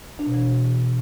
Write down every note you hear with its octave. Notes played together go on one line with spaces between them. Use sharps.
D4
B2
E3